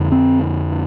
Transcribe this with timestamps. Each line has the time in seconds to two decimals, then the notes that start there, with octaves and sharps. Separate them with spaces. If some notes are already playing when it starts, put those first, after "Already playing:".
Already playing: F2 D3
0.12 C4